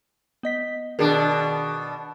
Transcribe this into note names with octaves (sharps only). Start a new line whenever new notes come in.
B3 D#5 B6
B2 D#3 D4 G#4 A#4